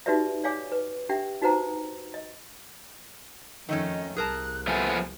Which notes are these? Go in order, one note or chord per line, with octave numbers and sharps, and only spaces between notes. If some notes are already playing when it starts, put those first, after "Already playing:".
D#4 F#4 G4 B4 D5 E5
C#5 D5 F5 G#5 D6
B4
D4 G4 E5 G5
D#4 F#4 B4 C5 F#5 A#5
D#5
F2 D#3 A3 C#4 D#5
C2 G#4 A#4 A5 F#6
F3 A3 B3 G#5